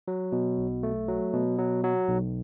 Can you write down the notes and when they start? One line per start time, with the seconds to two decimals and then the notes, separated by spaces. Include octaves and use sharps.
0.08 F#3
0.32 B2
0.58 B1
0.83 A3
1.08 F#3
1.33 B2
1.58 F#3
1.84 F#3
2.08 B1